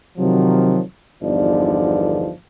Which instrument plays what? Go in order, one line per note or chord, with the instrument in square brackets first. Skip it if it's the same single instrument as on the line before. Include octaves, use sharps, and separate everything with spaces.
[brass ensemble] C3 D#3 F3 F#3
G1 E2 D3 F3 D#4 D5